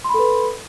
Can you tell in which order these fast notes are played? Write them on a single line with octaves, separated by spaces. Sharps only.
C6 B5 A4 B4